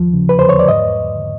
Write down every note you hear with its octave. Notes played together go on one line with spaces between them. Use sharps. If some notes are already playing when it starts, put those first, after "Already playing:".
Already playing: D#2 F3
C#3
B4
E2 C5
C#5
D5
G#2 D#5